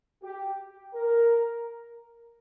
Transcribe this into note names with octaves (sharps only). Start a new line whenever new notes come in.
G4
A#4